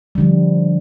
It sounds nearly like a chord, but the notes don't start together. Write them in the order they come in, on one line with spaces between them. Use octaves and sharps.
G3 D3 F3